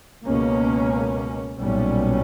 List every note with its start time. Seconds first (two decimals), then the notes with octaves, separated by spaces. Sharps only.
0.25 C#2 B2 A#3 C#4
1.60 B1 A#2 G3 C#4